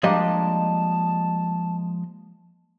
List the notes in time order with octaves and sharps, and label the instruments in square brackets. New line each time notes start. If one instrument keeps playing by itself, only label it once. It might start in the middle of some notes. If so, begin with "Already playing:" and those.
[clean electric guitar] F3 G#3 D#5 [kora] G3 A#3 D4 [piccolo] A5